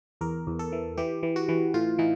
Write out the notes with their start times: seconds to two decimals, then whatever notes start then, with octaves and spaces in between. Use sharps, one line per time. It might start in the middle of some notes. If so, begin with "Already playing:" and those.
0.21 E2 A#4
0.47 E2
0.59 A4
0.72 E3
0.97 E3 G4
1.23 E3
1.36 F#4
1.49 E3
1.74 A2 F4
1.99 E3 D#4